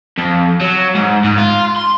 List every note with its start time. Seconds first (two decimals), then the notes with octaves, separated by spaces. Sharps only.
0.18 F2
0.61 F#3
0.95 G#2
1.24 G#2
1.38 F4
1.77 C6